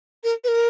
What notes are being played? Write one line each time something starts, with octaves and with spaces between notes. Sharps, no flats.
A#4
B4
A#4